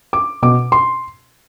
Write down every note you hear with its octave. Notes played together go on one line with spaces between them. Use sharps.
D6
B2 D6
C6